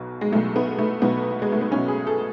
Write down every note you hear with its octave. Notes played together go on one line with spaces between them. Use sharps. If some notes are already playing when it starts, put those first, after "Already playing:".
Already playing: B1 B2
G#3
B1 B2 A3
B3
A3
B1 B2 B3
G#3
A3
B3
B1 B2 C#4
G#4
A4